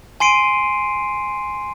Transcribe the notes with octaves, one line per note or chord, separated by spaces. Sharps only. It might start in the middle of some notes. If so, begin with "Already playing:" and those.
G#5 C6 C7 D7 D#7